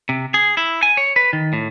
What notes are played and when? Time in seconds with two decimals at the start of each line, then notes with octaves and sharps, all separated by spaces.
0.09 C3
0.34 G#4
0.57 E4
0.83 G#5
0.97 C#5
1.16 B4
1.33 D#3
1.53 A2